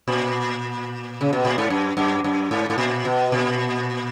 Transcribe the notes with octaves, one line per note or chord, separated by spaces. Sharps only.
A#2
C#3
B2
A#2
G#2
F#2
F#2
F#2
G#2
G#2
A#2
B2
A#2